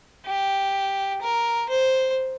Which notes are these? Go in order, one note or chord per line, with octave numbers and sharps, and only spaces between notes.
G4
A#4
C5